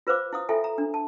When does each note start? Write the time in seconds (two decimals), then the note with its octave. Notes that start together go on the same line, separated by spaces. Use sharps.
0.07 F4 B4 C5 F5 D6
0.33 E4 F5 D#6
0.49 E4 F4 A4 E5 G5 G#5
0.64 A#5
0.78 D4
0.94 A5